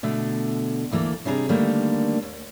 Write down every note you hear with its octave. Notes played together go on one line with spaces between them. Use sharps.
B2 D3 A3
D2 E3 A#3 A4
C3 G3 D4 G#4 A5 A#5
D3 D#3 G3 A3 A#3 D4
D#2